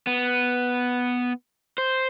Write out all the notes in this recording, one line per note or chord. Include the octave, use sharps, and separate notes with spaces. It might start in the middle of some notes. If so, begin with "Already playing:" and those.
B3
C5